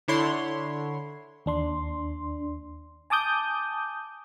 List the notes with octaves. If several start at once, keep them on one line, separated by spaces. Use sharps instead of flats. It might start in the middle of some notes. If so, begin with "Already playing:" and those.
D3 E4 C#5 C6
D#2 D4 C6
G#5 A5 D6 D#6 G6